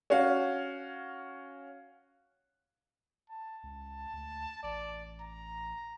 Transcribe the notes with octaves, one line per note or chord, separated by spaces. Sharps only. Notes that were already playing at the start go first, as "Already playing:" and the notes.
C#4 F#4 F5
A5
C#2
D2
A1 D5
A#5